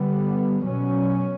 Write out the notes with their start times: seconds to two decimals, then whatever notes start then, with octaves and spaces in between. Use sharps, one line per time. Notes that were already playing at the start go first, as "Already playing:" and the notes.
Already playing: D3 G3 B3
0.64 B2 F#3 C#4